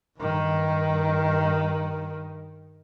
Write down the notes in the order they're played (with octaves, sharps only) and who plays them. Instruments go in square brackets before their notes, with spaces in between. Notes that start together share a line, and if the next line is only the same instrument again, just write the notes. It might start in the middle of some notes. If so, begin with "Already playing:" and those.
[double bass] G2 D#3